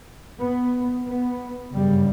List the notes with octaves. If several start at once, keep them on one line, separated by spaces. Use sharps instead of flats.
B3
B3
G1 F#2 C#3 G3